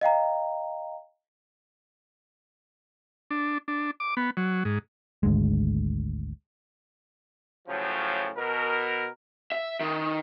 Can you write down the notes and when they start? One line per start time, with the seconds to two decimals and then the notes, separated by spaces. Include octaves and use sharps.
0.01 D#5 F5 G5 A#5
3.31 D4
3.68 D4
4.00 D6
4.17 B3
4.37 F#3
4.65 G#2
5.23 G#1 D2 G#3
7.68 A2 C#3 F3 F#3
8.37 B2 A#4
9.52 E5
9.80 D#3